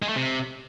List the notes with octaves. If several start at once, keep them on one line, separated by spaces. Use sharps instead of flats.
G#3
A3
C3